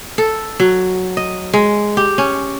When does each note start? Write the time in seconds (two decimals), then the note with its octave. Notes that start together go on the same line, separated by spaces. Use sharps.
0.18 A4
0.60 F#3
1.17 D#5
1.54 G#3
1.97 G4
2.18 C#4